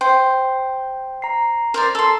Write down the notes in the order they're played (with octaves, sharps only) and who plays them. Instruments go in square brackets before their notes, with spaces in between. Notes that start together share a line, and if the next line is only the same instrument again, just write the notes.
[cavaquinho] C5 [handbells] G5
[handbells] A#5 C7
[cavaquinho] A#4 C5 D5
A4 C6